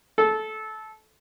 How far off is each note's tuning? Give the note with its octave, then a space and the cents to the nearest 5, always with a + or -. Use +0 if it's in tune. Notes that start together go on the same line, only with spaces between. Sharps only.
A4 -20